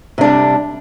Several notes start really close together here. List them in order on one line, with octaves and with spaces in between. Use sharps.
C3 D4 G3